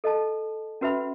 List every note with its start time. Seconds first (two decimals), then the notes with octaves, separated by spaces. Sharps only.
0.04 A4 D#5 A5
0.81 C#4 F#4 B4 E5 B5